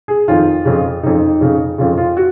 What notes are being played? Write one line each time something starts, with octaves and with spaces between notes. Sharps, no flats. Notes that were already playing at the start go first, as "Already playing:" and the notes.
G#4
F2 D#3 F4
F2 C#3
F2 C#3 D#4
F2 C#3
F2 C#3 F4
F4
F#4